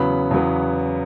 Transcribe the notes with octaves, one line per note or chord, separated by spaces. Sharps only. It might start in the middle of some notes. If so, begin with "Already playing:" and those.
Already playing: E2 C#3 F#3 B3 B5
E2 C#3 F#3 B3